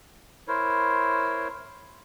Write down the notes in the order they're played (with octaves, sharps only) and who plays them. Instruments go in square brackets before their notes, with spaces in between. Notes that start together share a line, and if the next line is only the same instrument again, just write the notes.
[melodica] E4 A#4 C5 C#5